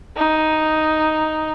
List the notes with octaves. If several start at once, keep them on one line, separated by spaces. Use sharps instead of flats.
D#4